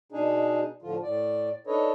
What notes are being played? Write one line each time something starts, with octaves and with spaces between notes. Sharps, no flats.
B2 D4 D#4 G#4
A2 D3 F3 F4
A2 D5
D4 D#4 A4 B4 C#5 D#5